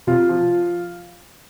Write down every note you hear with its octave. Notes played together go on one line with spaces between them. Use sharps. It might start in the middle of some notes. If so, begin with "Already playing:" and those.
C3 F4
F3